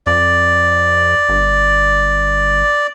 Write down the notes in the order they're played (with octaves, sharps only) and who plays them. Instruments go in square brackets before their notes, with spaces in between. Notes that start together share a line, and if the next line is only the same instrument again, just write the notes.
[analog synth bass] F2 [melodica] D5
[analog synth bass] G1